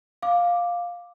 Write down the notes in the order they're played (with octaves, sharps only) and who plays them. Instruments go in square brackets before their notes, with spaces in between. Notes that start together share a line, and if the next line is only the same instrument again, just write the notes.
[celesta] F5 D6